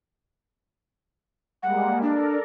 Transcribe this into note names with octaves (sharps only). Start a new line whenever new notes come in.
G3 G#3 A#3 F#5
D4 A4 A#4 D5